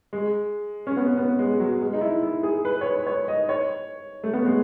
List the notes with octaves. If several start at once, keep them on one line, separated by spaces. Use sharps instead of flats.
G#3
C#4
B3
B3
G#3
F#3
G#3
D#4
E4
E4
G#4
B4
C#5
B4
C#5
D#5
C#5
A3
B3
G#3